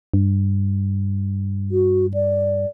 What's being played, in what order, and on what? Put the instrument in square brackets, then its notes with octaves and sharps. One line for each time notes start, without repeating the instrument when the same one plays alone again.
[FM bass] G2
[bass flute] F#4
D5